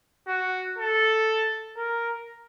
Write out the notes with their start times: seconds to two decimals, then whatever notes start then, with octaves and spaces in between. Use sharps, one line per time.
0.27 F#4
0.78 A4
1.77 A#4